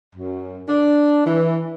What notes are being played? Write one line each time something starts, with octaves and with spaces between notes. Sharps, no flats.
F#2
D4
E3